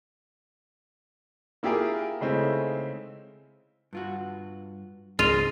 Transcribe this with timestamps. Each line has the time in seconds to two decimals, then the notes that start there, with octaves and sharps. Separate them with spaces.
1.63 A#3 E4 F4 G4 G#4 A#4
2.21 C#3 G#3 A3 C4 D#4 E4
3.93 G2 F4 F#4
5.19 C#2 G#2 C4 D4 F4 G#4 D#7 F7